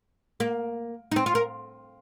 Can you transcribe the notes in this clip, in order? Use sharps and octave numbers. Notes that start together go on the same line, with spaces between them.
A#3
D#4
C4
F4
A#4